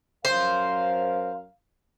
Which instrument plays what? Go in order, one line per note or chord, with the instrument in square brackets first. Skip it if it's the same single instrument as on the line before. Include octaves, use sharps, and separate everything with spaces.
[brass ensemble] F#2 A#4 F5 [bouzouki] C5